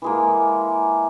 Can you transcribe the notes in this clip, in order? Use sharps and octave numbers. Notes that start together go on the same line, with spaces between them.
E3 G#3 A#3